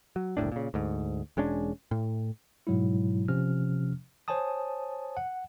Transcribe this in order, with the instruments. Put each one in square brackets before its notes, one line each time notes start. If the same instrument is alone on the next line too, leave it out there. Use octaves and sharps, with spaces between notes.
[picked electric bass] F#3
F#1 C2 A2 D4
A#2 C#3
D2 G#2
E1 G#3 C#4 D4
A2
[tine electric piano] G#2 B2 F#3 G#3 E4
C3 F3 C#4 F6
C5 C#5 G#5 A5 D#6
F#5